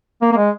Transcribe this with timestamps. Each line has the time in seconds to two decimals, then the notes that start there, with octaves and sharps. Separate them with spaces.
0.22 A#3
0.32 A#3
0.37 G#3